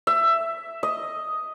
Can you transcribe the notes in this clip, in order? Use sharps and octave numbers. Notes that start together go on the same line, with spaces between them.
E5
D#5